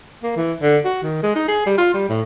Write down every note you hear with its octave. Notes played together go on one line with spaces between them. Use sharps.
A#3
E3
D3
F#4
D#3
G#3
D#4
G#4
G3
F4
G3
A2